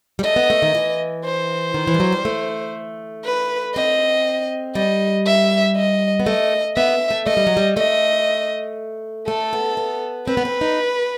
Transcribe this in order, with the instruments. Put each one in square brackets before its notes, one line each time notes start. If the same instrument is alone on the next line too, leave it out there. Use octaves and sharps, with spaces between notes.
[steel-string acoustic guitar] G3
[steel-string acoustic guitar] A3 [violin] D#5
[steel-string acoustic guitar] B3
A3
D#3
E3
[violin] C5
[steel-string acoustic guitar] D#3
E3
G3
F#3
G3
A3
[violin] B4
[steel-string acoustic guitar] C4 [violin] D#5
[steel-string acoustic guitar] G3 [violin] D#5
[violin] E5
D#5
[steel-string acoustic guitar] B3
[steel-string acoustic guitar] A3 [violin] D#5
[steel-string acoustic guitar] B3 [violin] E5
[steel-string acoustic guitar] A3
[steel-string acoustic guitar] A3 [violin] D#5
[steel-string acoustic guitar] G3
F#3
G3
[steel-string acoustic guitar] A3 [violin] D#5
[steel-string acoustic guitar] A3 [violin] A4
[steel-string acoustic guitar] B3
B3
[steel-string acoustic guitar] C4 [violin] B4
[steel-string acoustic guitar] B3
C4
D#4